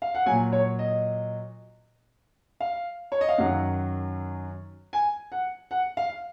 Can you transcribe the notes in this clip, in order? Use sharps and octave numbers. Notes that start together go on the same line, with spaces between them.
F5
F#5
A#2 F#3 G#5
C#5
D#5
F5
C#5
D#5
F5
F#2 D#3 F#3 F#5
G#5
F#5
F#5
F5